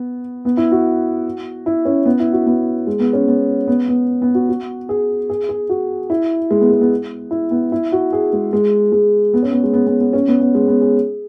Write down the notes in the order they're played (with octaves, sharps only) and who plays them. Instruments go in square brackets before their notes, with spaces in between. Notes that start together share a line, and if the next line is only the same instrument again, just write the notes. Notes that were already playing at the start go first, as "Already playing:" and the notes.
Already playing: [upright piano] B3
B3
E4
F#4
E4
C#4
B3
E4
F#4
B3
G#3
B3
C#4
B3
B3
B3
B3
F#4
F#4
G#4
G#4
G#4
F#4
E4
G#3
B3
G#3
B3
E4
B3
E4
F#4
G#4
G#3
G#3
G#3
B3
C#4
B3
G#3
B3
B3
B3
C#4
B3
B3
G#3
B3
G#4